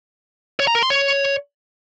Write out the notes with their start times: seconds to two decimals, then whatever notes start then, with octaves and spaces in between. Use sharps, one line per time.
0.60 C#5
0.67 A#5
0.75 A#4
0.83 C6
0.90 C#5